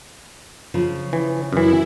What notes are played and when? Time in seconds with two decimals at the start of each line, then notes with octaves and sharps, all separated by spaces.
0.74 C#3 F3
1.13 E3
1.53 F#2 E3 E4